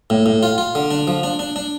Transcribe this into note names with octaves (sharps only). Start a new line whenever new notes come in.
A2
A2
F4
F4
D3
D4
F3
D4
D4
D4